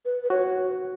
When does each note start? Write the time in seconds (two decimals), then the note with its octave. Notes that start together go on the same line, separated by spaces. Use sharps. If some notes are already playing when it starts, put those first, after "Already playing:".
0.05 B4
0.24 B4
0.30 F#4 C#5